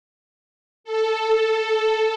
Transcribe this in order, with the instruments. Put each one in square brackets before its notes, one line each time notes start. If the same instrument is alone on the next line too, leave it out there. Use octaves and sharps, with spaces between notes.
[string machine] A4